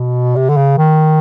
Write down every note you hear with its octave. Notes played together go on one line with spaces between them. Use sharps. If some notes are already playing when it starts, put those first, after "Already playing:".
Already playing: B2
C3
D3
C#3
D#3